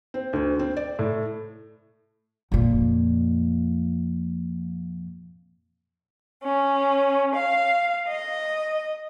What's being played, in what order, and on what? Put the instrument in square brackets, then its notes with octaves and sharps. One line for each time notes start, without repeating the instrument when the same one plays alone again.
[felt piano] C4
D2
C4
D5
A2
[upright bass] F2 A#2
[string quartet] C#4
F5
D#5